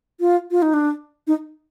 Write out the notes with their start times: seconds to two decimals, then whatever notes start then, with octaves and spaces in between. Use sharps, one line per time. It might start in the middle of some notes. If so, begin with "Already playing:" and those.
0.20 F4
0.51 F4
0.62 D#4
0.74 D4
1.27 D#4